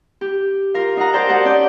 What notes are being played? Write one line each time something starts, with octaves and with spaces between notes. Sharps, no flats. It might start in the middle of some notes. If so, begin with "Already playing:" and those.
G4
F4 A#4 F5
D#4 F5 F#5 A#5
G4 A#4 C5 D5 G5 A5
D#4 F#4 A#4 F#5 A5
C#4 D5 D6 G6